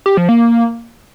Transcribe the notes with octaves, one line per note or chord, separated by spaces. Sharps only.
G4
F3
A#3